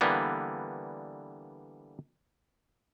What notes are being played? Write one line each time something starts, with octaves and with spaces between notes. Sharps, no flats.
D3 E3 G3 A#3 B3